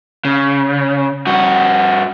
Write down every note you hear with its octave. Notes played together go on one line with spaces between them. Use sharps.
C#3
G2 F#4